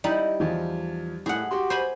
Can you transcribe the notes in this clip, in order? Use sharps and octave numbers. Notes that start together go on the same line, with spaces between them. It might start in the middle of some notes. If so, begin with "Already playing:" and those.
G3 D#4 E4 B5
E2 F3
A2 G#4 F#5
F#4 G4 C6
C5 G#5 B5